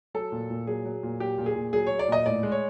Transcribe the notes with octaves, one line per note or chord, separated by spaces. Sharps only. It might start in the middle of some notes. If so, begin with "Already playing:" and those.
F#3 A4
A#2
A#2
F#3 G#4
F#3
A#2
F#3 G4
A#2
G#4
A#2
F#3 G#4
F#3 C#5
D5
A#2 D#5
A2 D5
G#3
C#5